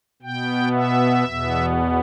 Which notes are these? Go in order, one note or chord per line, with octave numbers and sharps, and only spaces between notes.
B2 B3 G5
E5
E2 B2 B3